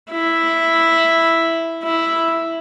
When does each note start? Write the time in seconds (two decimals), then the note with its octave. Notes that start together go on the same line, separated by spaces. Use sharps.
0.11 E4
1.83 E4